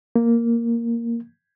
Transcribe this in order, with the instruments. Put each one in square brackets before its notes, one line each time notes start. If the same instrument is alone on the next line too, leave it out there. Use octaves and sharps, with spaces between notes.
[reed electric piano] A#3